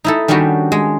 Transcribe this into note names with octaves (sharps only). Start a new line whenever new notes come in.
D#4 E4 A4
D#3 G3 C#4 D4 F#4 B4
G#3